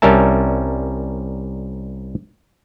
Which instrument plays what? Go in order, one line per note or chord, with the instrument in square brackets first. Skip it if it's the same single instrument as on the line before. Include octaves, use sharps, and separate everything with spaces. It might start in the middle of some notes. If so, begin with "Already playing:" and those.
[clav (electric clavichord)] C2 G3 C#4 A#4 E5 A5